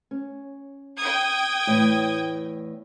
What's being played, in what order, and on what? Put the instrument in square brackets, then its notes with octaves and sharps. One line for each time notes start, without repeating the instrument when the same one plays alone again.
[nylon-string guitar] C#4
[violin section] G5 D#6 G#6
[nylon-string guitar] E2 A2